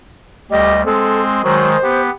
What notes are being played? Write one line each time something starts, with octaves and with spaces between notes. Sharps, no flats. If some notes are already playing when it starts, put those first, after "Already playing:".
D2 G3 G4 D#5
G#3 C4 A4
D#3 F#3 G#3 C5
B3 G4